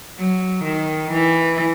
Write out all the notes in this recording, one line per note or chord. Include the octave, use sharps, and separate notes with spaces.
F#3
D#3
E3